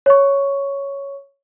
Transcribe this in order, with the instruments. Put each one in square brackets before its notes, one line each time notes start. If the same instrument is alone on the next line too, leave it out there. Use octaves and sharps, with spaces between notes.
[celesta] C#5 C#6